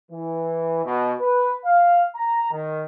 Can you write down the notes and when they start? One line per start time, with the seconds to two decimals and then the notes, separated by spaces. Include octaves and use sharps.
0.11 E3
0.85 B2
1.20 B4
1.65 F5
2.16 A#5
2.51 D#3